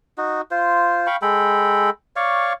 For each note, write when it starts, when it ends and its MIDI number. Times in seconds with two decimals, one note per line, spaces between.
0.18 0.41 63
0.18 0.41 66
0.51 1.07 65
0.51 1.07 72
1.07 1.16 77
1.07 1.16 79
1.07 1.16 83
1.07 1.16 85
1.22 1.90 56
1.22 1.90 69
1.22 1.90 79
1.22 1.90 83
2.16 2.53 73
2.16 2.53 74
2.16 2.53 77
2.16 2.53 85